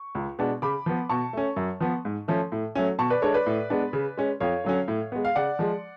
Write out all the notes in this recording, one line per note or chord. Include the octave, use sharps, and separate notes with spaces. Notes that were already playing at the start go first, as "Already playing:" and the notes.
Already playing: C#6
C#2
B2 G#3 B3 D4
C#3 B5 D6
F3 B3
B2 A5 C#6
A3 C#4
F#2
F3 B3
G#2
F3 A3 C#4
A2
F#3 A3 C#4
B2 A5 C#6
B4 D5
G#3 D4 A4 C#5
B4 D5
A2
G#3 B3 D4
C#3
G#3 C#4
F2 C#5 F5
D3 F#3 C#4
A2
G#3 B3
F5
C#3 D5 F#5
F3 G#3